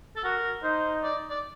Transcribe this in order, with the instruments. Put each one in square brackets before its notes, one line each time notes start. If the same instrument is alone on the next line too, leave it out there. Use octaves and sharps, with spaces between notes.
[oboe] A4
[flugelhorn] F#4 [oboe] A#4
[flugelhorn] D#4 [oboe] C5
[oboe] D5
D5